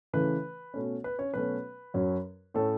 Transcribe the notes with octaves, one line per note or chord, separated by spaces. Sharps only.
C#3 E3 A3 C#4 B4
B2 A3 C#4
B4
C#4 C#5
B2 F#3 A3 C#4 B4
F#2 F#3 C#4
A2 A3 C#4 A4